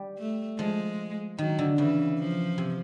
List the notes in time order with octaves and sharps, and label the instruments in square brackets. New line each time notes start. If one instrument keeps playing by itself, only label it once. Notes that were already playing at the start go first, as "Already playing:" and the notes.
Already playing: [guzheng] G3
[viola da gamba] A3
[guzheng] F3 [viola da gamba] G#3
[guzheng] D#3 [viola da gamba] F#3
[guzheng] D3
[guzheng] C#3 [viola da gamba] E3
[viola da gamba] F3
[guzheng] C3